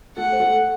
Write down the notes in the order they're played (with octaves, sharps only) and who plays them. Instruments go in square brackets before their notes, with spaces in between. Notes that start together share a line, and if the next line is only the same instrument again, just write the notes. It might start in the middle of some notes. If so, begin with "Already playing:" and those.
[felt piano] A3 A4 [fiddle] F#5
[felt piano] C5
A3 A4